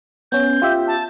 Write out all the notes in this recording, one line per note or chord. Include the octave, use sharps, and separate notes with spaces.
B3 C#4 G6
F4 G4 E5
A5